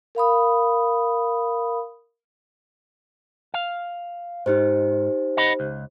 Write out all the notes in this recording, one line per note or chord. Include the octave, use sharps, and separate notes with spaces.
A#4 F5 B5 D#6
F5
G#2 D#4 G4 C5
D#5 F#5 B5
C#2